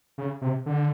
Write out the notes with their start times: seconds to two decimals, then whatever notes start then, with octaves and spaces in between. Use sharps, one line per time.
0.18 C#3
0.41 C3
0.66 D3